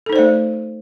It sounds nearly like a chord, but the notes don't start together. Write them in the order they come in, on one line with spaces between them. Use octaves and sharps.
A4 D#4 C5 D5 A3